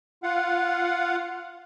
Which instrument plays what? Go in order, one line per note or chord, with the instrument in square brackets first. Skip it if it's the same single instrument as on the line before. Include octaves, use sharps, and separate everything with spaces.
[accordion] F4 F5 F#5